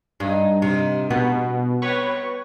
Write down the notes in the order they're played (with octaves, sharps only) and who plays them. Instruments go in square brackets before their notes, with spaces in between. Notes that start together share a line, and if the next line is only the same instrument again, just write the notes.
[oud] G2 [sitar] D#4
[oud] C3 [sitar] D#3 A#3 F4
[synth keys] B2 [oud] B3
[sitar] B2 C4 [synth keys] B4 C#5 C#6